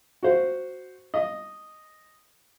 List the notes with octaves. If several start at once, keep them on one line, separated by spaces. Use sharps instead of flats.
F#4 C5
D#5